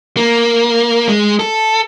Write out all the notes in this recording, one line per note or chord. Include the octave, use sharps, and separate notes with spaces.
A#3
G#3
A4